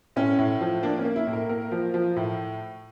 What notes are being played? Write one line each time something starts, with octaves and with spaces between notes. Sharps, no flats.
A2 C#4
A2
F3
A#3 D4
C#4
A#3
E4
A2
A#4
A#3 A#4
F3
F3
A2